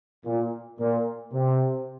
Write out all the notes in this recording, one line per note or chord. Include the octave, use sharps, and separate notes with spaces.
A#2
A#2
C3